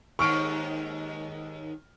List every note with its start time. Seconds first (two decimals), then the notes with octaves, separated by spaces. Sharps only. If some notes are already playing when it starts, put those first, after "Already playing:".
0.19 D#2 G#2 D#3 C#6 F6 D7